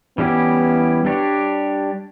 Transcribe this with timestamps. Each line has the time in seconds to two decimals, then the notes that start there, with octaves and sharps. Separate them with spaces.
0.18 E3 G3 B3 C#4 E4 G4
1.05 G3 D4 G4 C#5